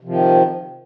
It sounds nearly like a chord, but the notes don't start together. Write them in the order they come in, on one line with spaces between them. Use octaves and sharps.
C3 F3 D#3